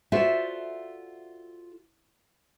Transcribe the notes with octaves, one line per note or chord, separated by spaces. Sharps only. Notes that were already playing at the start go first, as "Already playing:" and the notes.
F4 F#4 A4 C5 D5 E5